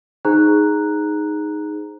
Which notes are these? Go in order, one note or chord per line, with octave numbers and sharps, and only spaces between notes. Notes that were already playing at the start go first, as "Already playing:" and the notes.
D#4 G#4 C5 A#5 F#6